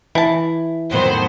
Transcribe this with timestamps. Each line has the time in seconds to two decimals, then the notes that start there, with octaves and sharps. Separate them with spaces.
0.15 E3 E4 A5
0.91 F2 A2 D#3 F#3 B3 C5